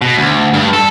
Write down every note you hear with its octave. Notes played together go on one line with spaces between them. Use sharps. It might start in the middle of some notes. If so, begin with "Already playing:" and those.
B2
D2
G2
A4